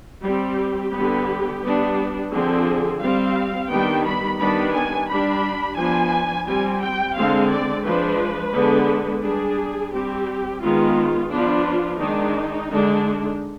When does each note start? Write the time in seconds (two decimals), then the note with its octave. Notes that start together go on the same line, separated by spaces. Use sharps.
0.24 G3 C4 G4
0.93 D3 G3 B3
1.63 G3 B3 D4
2.31 D3 F3 C4 G#4
3.01 G3 C4 F5
3.70 D#3 G3 B3 D4 G5
4.05 B5
4.39 D#3 G3 B3 D4 B5
4.74 G#5
5.08 G3 D4 B5
5.77 F3 B3 D4 G#5
6.47 G3 C4 G#5
6.82 G5
7.16 D3 G#3 C4 F5
7.50 D5
7.85 F3 G#3 D4 B4
8.54 D3 G#3 B3 D4
9.23 G3 D4 G#4
9.92 G3 C4 G4
10.61 D#3 G#3 B3 F4
11.30 F3 B3 D4 F4
11.99 D#3 G#3 D4 D#4
12.69 D3 G#3 D4